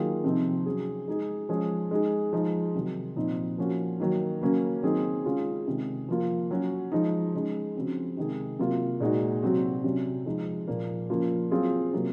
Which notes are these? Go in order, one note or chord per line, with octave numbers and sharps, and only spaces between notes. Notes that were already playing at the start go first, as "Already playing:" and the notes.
Already playing: D#3 F#3 A#3 F4 G#4
C3 F3 C4 D#4
F#3 C#4 G#4
G#3 D#4 G#4
F3 G#3 C#4 G#4
G#3 D#4 G#4
F3 G#3 D#4
C3 D#3 F#3
A#2 F3 C4 D#4
F3 A#3 C#4 F#4
D#3 F#3 A#3 D#4
C#3 F#3 A#3 C#4
D#3 F#3 C4 D#4 G#4
C#3 G#3 C#4 F4 G#4
C3 D#3 G#3 C#4 G#4
F3 A#3 F4
F#3 C#4 F#4
F3 G#3 D#4
C#3 G#3 D#4
C#3 F3 C4 F#4
C3 D#3 G#3 D#4 G#4
C3 F#3 A#3 F4
A#2 G#3 D#4 F#4
C3 F#3 C4 F#4
C3 F#3 C#4
F3 G#3 D#4
A#2 F3 A#3
C#3 F3 A#3 F4
F#3 C4 F4 G#4
C3 F#3 A#3